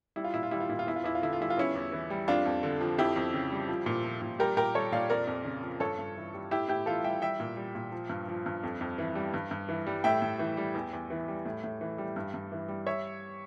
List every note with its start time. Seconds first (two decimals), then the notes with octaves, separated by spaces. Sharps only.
0.16 G3 E4
0.24 F4
0.33 A#2 E4
0.43 F4
0.51 G3 E4
0.60 F4
0.69 A#2 E4
0.79 F4
0.87 E2 E4
0.96 F4
1.04 E2 E4
1.15 F4
1.22 D3 E4
1.33 F4
1.40 G3 E4
1.50 F4
1.57 E2 C#4 E4
1.75 E2
1.92 E3
2.10 G3
2.28 F2 D4 F4
2.45 F2
2.63 D3
2.81 F3
2.98 F2 E4 G4
3.16 F2
3.34 C#3
3.52 G3
3.69 F3
3.86 A#2
4.04 F3
4.22 A#2
4.39 G3 G4 A#4
4.57 A#2 G4 A#4
4.75 G3 A4 C#5
4.92 A#2 D5 F5
5.10 F2 A#4 D5
5.27 F2
5.45 C#3
5.63 F3
5.80 G2 A4 C#5
5.99 G2
6.16 E3
6.34 G3
6.51 A2 E4 G4
6.69 A2 E4 G4
6.86 E3 F4 A4
7.04 G3 E5 G5
7.21 G3 E5 G5
7.40 A#2
7.57 G3
7.75 A#2
7.92 F3
8.10 G2
8.28 F3
8.46 G2
8.63 F2
8.81 F2
8.98 E3
9.15 G3
9.34 G2
9.51 G2
9.69 E3
9.87 G3
10.04 A2 E5 G5
10.22 A2
10.39 E3
10.57 G3
10.75 E2
10.93 E2
11.10 E3
11.28 G3
11.45 A2
11.64 A2
11.81 E3
11.98 G3
12.16 G2
12.34 G2
12.52 E3
12.68 G3
12.86 C#5 E5